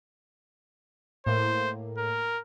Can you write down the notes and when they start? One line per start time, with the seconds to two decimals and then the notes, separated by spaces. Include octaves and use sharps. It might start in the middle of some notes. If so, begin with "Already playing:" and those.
1.27 A2 A#3 C5
1.98 A#4